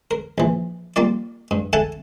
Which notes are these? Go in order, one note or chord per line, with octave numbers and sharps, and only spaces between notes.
A#4
A#1 E3
G3 A#3 F4 D5
G2
A4 E5 F#5 G#5 A5